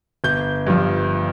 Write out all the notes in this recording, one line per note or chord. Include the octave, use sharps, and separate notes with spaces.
G1 G6
G2 F3